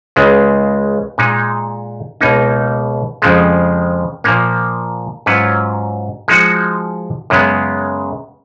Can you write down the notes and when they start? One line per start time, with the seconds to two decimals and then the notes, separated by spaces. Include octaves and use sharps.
0.16 C#2 C#3 G#3
1.18 A#2 G#3 D#4
2.21 C#2 B2 A#3 D#4
3.22 F2 C#3 F3 G#3
4.24 A#2 F3 A#3
5.26 G#2 F#3 C#4 F4 B4
6.28 F3 G#3 D#4 F#4
7.30 F#2 C#3 G#3 B3